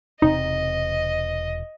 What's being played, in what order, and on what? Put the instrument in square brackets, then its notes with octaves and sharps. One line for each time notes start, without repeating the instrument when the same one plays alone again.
[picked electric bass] E1 C3 C4 [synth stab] D#4 [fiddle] D#5